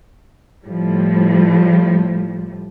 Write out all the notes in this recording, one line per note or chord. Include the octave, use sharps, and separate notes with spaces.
A2 F3 G3